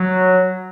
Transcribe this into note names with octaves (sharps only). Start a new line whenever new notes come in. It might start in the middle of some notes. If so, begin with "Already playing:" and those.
Already playing: F#3